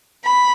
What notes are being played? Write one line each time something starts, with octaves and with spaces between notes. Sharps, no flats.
B5